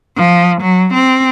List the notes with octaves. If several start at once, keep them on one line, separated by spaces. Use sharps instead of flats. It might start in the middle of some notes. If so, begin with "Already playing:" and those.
F3
F#3
C4